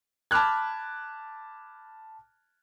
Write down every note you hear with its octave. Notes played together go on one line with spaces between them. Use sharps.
A5 B5 D6 F6 F#6 G#6